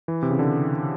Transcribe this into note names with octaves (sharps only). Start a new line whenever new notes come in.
E3
C3
C#3
D3